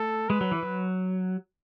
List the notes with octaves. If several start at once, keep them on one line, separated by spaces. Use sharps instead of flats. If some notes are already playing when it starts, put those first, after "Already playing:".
Already playing: A3 A4
G#3 B4
F#3
E3
F#3